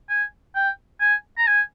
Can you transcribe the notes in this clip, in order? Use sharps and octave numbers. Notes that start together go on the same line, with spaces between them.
G#5
G5
G#5
A#5
G#5